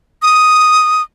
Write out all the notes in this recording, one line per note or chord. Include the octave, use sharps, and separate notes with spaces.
D#6